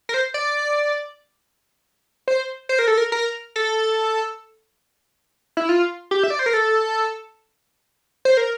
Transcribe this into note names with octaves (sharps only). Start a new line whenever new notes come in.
A#4
C5
D5
C5
C5
A#4
A4
A#4
A#4
A4
E4
F4
G4
E5
D5
C5
A#4
A4
C5
A#4